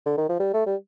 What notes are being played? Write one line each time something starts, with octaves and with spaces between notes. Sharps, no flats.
D3
D#3
F3
G3
A3
G3